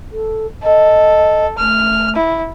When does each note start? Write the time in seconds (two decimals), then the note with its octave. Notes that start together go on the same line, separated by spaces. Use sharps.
0.12 A4
0.63 A4 D#5
1.58 A3 F6
2.16 E4